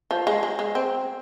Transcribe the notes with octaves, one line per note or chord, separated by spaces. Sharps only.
F3
G#3
G#3
G#3
C4